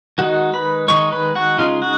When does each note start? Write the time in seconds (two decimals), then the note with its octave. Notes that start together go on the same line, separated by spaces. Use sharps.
0.18 D#3 G#3 D#4 F#4 F#5
0.53 B4 B5
0.88 D#3 G#3 D#4 C#5 C#6
1.12 B4 B5
1.35 F#4 F#5
1.58 C#3 G#3 D#4 F4 F5
1.82 F#4 F#5